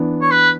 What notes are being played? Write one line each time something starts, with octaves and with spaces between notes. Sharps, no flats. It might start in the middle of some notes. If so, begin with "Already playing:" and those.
Already playing: E3 B3 D4
C#5
B4